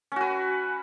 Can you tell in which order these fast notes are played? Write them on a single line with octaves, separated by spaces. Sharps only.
C#4 F#4 B4